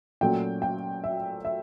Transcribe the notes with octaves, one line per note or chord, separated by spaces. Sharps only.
A#2 F#3 A3 C#4 G5
G5
E5
E5